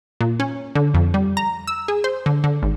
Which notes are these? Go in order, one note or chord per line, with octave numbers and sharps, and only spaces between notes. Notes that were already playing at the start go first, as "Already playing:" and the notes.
A#2
C#4
D3
F2
G3
A#5
E6
G#4
C5
D3
D3
G#1